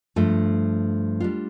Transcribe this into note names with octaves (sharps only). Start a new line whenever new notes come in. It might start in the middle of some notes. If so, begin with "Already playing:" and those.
G2 F3 A3
G3 D4 F4